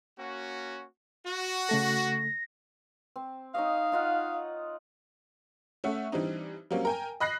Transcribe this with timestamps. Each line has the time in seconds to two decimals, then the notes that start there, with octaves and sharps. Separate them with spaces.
0.19 A#3 C#4 F#4
1.26 F#4
1.69 C#3 A3 A4 A#6
3.16 C4
3.55 D#4 C#5 D#5 F5
3.92 D#4 F4 F#5
5.84 A3 C#4 E5 F#5
6.12 E3 G3 C4 D4 D#4
6.71 F#3 G3 A#3 C4 C#4
6.85 A#4 G5 G#5
7.20 D#5 B5 F#6 A#6 C7